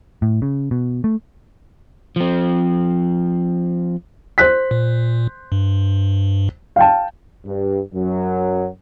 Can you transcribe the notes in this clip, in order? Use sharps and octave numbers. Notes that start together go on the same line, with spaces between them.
A2
C#3
B2
A3
F3 C4
C5 F#6 B6
A#2
G2
F5 G5 A5
G2
F#2 F#3